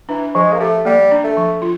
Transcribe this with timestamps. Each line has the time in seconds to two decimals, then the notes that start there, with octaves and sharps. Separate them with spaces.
0.09 E3 D4
0.35 F3 G#3
0.53 A#3
0.60 A3 G4
0.85 G3 A#3
1.11 D4
1.24 A3
1.37 F3
1.62 F4